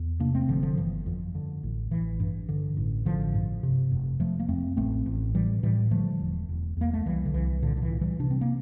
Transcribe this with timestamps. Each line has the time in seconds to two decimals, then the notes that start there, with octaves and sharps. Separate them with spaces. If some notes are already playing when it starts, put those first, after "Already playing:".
Already playing: E2
0.20 C3 A#3 D4
0.35 A3 C4
0.48 G1 D3 F3
0.63 D3 F3
0.77 G1 E3
1.06 F2
1.35 D3
1.63 A1
1.91 A1 E3
2.20 G2
2.49 D3
2.77 A1
3.05 A1 D3 F3
3.34 G2
3.63 C3
3.91 F1
4.20 F1 F3 A3
4.40 A#3
4.48 F2 A3 C4
4.77 A1 A3 C4
5.06 A1
5.34 A2 E3 G3
5.63 A2 E3 G3
5.91 D3 F3 A3
6.20 E1
6.49 E1
6.77 E2 A#3
6.93 A3
7.06 C2 E3 G3
7.25 D3
7.34 C2 E3
7.62 A#2 D3
7.77 D3
7.82 E3
7.92 A#2
8.01 E3 G3
8.20 C3 D4
8.31 C4
8.41 A#3